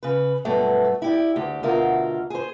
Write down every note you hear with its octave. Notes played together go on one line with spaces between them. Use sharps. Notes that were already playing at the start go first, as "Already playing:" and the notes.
C#3 B4
G2 B2 F#3 A3
E4 G4 D5
D2 G4
D2 B2 F4 A#4 E5
G#4 C5